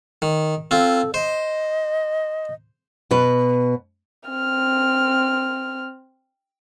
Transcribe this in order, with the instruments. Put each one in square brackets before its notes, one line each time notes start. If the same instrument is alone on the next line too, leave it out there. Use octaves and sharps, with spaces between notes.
[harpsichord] D#3
[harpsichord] C4 F4 [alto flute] A4
[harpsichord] C5 [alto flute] D#5
[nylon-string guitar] B2 B4
[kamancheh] C4 F6